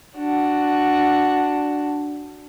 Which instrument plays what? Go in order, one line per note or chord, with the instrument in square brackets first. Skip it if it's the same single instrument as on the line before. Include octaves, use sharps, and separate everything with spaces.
[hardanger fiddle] D4 F#4